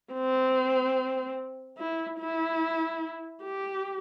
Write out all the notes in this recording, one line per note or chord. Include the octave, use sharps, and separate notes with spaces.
C4
E4
E4
G4